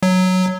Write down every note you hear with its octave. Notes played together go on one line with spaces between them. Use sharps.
F#3